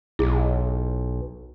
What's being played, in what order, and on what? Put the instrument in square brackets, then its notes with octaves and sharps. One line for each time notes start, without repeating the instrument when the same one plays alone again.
[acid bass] B1 [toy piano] E4 G#4